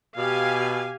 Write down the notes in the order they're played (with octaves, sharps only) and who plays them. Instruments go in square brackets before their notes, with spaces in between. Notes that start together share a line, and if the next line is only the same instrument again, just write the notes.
[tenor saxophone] B2 [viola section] G4 F5 G#5